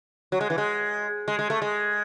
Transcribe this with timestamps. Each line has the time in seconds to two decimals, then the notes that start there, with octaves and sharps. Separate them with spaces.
0.32 F#3
0.41 G#3
0.50 E3
0.58 G#3
1.28 G#3
1.39 G#3
1.50 A3
1.62 G#3